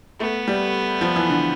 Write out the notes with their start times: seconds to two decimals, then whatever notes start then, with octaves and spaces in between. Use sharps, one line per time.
0.20 A3 B3
0.48 G3
1.01 F3
1.16 E3
1.30 D3